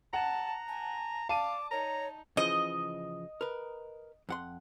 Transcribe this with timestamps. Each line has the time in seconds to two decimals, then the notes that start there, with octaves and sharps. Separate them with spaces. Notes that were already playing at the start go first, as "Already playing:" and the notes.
0.13 F#5 A5 A#5
0.68 G#5 A5
1.29 D5 F5 A5 D6 D#7
1.71 D#4 C#5 A#5
2.37 C#3 E3 F3 D#5
3.41 A#4 B4
4.29 F2 F#5 C6